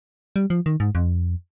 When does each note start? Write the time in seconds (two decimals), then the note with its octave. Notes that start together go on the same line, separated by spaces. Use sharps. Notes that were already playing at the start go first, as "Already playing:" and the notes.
0.36 G3
0.50 F3
0.66 D#3
0.80 G#2
0.95 F2